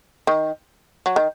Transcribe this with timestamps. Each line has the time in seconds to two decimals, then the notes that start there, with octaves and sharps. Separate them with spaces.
0.27 D#3
1.06 F#3
1.16 D#3